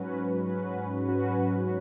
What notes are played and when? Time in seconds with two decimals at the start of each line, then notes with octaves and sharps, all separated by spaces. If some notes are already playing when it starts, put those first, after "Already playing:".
Already playing: G#2 F#3 C#4 F#4 B4
0.13 G#2
0.44 F#3 C#4 F#4 B4
0.76 G#2
1.07 F#3 C#4 F#4 B4
1.39 G#2